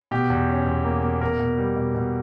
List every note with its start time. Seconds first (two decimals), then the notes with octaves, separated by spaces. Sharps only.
0.11 B2 G4
0.30 E2
0.48 C#4
0.66 E2
0.84 A#3
1.03 A#3
1.21 B2 A#4
1.39 B2
1.58 G3
1.76 B2
1.94 B2